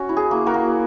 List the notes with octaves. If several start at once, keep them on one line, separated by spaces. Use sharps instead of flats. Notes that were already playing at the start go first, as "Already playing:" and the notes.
Already playing: C#4 F#4
E4
G#4
A#3
F#4 A#4
A#3